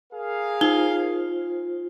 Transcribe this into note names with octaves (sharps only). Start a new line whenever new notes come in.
G#4 A#4 F5
D#4 F4 C5 G7